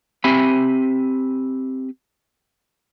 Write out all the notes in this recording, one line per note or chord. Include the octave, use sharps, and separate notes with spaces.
C4 G4 E5 G#5 B5